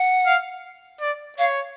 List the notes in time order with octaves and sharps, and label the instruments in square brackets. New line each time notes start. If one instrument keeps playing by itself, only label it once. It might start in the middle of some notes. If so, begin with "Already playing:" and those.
Already playing: [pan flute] F#5
[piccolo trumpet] F5
D5
[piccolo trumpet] C#5 [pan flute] F5